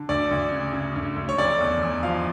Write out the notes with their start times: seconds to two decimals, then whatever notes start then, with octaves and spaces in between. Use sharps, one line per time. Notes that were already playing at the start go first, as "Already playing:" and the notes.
Already playing: D3
0.09 D2 D5
0.31 D2
0.52 C#3
0.73 C#3
0.96 D2
1.16 D2
1.29 C#5
1.38 F1 D5
1.61 E2
1.82 E2
2.03 F3 F5